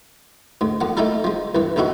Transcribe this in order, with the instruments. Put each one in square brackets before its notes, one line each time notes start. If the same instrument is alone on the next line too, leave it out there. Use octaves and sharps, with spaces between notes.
[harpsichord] D2 G#2
F2 A#3 F#5
A3 A#3 D#4 E4 A4 A#4
F3 G#3
C2 G2 E3
A#1 F2 D#4 E4 F#4 F#5